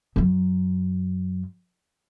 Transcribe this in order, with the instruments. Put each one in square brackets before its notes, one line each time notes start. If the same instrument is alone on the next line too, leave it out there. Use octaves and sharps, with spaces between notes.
[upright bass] F#2 F#3